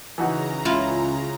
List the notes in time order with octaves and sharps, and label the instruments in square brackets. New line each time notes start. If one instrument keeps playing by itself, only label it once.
[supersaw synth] C#3 A#5 [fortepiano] E3 D#4 F#4
[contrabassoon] C#2 [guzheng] E4 F4